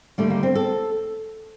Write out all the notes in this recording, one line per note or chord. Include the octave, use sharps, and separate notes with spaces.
D#2 D3 G3 A3
A#3
C4
A4